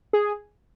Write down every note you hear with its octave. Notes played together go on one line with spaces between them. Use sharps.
G#4